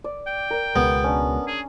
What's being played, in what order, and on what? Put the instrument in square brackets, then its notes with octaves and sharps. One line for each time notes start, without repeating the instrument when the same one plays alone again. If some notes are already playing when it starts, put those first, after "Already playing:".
[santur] D5
[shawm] G5
[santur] A#4 D5
[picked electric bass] C#2 B2 G#3 [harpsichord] B3
[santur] C#4 D4
[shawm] G#4